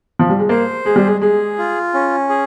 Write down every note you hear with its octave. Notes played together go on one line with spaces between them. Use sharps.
F3
G3
G#3
A#3 C5
G#3 G#4
G3
G#3
G#3 G#4
F4
C#4
G#4